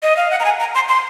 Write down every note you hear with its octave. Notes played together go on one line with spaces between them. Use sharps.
D#5
F5
F#5
A#5
G#5
A#5
C6
C6